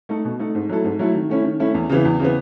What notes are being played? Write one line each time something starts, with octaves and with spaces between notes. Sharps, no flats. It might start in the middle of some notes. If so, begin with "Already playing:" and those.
A3 D#4 A4
B2
A3 D#4 A4
G#2
F#3 A3 E4 A4
G#2
F#3 A3 E4 A4
D#3
A3 C#4 E4
D#3
A3 C#4 E4
E2
C#3 E3 B3
E2
C#3 E3 B3